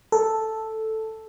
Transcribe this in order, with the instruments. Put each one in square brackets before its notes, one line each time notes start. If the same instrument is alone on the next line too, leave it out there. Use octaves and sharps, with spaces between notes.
[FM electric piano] A4